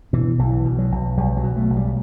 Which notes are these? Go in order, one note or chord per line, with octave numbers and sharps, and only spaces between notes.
B2 E3
B1 E3
B2
F#3
B1
B1 G3
F#3
B2
A3
B1
G3